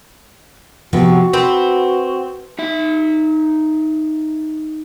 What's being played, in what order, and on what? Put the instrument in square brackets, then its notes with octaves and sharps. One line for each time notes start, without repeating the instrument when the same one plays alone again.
[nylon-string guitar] C3 F3 B3 [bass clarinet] F#4
[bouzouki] C4 [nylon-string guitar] B4
[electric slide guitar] D#4 E5